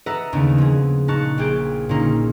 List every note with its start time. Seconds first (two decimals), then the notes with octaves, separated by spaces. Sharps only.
0.06 A4 B4 D#5 E5 F#5 A#5
0.33 D#2 C#3 B3 D4 D#4
0.58 F3 G#4
1.08 A#2 D#4 A5 C#6 F#6
1.38 A#1 G4 G#4 G6 D7
1.89 A#2 D3 A#3 C#4 D#4